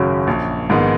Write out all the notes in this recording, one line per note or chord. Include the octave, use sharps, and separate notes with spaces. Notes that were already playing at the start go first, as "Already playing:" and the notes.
Already playing: G#1 F#2 C#3 F#3 C#4 C#5
A#1
G#2 D#3 G#3 B3